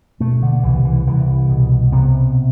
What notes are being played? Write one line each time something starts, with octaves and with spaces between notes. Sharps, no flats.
B2 A3
D3
C2 E3
E3
C2 E3
B2
C3 B3